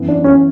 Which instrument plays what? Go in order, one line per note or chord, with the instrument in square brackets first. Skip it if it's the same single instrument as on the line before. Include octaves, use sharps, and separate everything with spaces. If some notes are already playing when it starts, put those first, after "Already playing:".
Already playing: [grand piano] F#2 E3 B3 E4 B4
[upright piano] D4
C#4